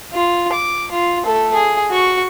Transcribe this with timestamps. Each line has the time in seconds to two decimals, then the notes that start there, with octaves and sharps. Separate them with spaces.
0.14 F4
0.53 D6
0.92 F4
1.25 A3 A4
1.54 G#4
1.90 F#4 C#6